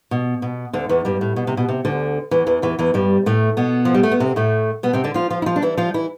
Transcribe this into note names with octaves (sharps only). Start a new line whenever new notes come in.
B2
B2
D2 D3
E2 E3
G2 G3
A2
B2
C3
B2
C3
D2 D3
E2 E3
E2 E3
E2 E3
E2 E3
G2 G3
A2 A3
B2 B3
F3
G3
A3
B3
C3 C4
A2 A3
B2 B3
C3 C4
D3 D4
F3 F4
F3 F4
E4
F3 F4
D4
E3 E4
F3 F4
E3 E4